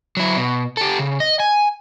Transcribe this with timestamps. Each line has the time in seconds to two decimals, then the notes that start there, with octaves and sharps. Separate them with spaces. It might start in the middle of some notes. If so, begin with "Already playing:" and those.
0.17 F#3 E4
0.37 B2
0.77 G4 A4
0.99 C#3
1.20 D#5
1.40 G#5